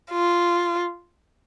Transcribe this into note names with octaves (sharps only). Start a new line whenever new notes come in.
F4